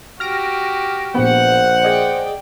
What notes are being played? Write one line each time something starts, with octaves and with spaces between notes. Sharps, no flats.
F#4 G4 F6 A#6 D7
A#1 A#2 B3 C5 F#5
G#4 D5 D#5 G5